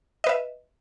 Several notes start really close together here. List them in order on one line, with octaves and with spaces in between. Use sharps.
D#5 B4 E5